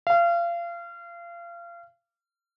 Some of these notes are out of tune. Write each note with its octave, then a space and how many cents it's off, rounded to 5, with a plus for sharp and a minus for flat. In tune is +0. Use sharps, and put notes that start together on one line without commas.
F5 -30